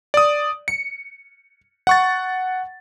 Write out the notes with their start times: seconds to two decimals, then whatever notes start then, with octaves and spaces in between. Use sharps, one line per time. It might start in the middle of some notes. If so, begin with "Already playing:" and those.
0.14 D5 D#6
0.68 C#7
1.87 F#5 C#6 A6